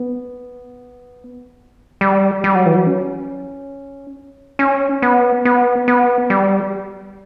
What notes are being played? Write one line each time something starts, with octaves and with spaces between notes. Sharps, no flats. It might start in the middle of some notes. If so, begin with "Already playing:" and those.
Already playing: B3
G3
G3
F#3
E3
F#3
C#4
C#4
B3
B3
B3
G3